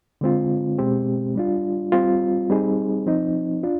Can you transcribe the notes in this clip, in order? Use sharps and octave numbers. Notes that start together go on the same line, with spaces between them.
D3 G#3 C4 F4
B2 G#3 C4 G4
G3 D4 F4
G3 C4 F4
G3 C4 D#4 G#4
F3 C4 D#4
D4 F4